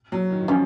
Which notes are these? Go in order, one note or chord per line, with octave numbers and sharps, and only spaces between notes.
F#3
D#3
D#3
F3 C#4 F4